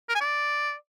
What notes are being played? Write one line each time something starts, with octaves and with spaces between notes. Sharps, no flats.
A#4
G#5
D5